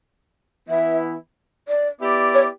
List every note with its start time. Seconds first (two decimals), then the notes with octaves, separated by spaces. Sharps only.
0.69 E3 B3 E4 E5
1.68 D5
2.01 B3 E4 G4 D5
2.34 C#5